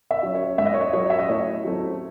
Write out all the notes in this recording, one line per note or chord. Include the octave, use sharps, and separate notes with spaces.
E5
F#3 C#4
C#5
G#2 E5
D#5
C#5
D#5
F#3 C#4 C#5
E5
D#5
A2 C#5
F#3 A3 C4